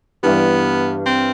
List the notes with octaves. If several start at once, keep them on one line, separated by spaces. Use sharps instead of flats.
G2 E3 G3 B3
C4